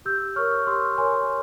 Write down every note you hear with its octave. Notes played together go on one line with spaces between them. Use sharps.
G4 E6 G6
A#4 C#5 C#6 F6
G4 C6 E6
A#4 C#5 G#5 C6